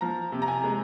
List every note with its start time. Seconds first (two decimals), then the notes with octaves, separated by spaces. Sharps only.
0.01 F3 A#5
0.32 C3
0.42 A#5
0.48 G#5
0.64 G#3